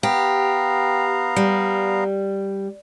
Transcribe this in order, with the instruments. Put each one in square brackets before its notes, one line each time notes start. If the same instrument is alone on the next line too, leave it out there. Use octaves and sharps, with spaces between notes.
[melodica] B3 F5 A#5 [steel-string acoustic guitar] G4
[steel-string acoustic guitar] G3